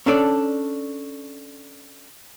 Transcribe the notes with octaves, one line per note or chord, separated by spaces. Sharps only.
C#4 D4 A4 D5